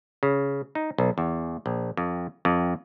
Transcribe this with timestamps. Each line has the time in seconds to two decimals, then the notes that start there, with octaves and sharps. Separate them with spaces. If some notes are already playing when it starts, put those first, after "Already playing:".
0.23 C#3
0.75 D#4
0.98 B1
1.18 E2
1.66 A#1
1.97 F2
2.45 F2